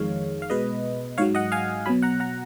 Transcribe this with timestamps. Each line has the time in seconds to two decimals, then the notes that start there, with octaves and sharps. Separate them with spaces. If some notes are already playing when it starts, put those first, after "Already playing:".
Already playing: F2 D#3 G#3 C#5 F5
0.42 F5
0.50 B2 G#3 B4 D#5
1.18 G#2 F#3 C#5 F5
1.35 D#5 F#5
1.52 F5 G#5
1.86 B2 F#3 G#5 B5
2.02 F#5 A#5
2.20 F#5 A#5